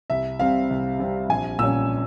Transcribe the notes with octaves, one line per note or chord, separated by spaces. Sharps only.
C2 E5
C3 G3 C4 F5
C2
C3 G3 C4
A#1 G#5
A#2 G3 C#4 E6